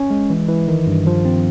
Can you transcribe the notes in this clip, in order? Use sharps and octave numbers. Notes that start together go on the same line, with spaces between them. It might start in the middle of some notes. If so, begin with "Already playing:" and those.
Already playing: C#4
G#3
E3
E3
D#3
G2
F3
C4